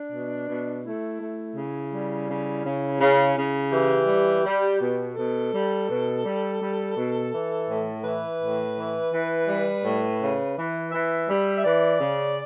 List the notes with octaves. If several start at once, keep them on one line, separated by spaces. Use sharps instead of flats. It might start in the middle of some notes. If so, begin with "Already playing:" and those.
Already playing: D4
B2
B2
A3 E4
A3
C#3
G3
C#3
C#3
C#3
C#3
E3 G4
G3
G3
B2
B2 A4
G3
B2
G3
G3
B2
E3
A2
E3 B4
A2
E3
E3
G3
A2
C#3
E3
E3 E5
G3
E5
E3 D5
C#3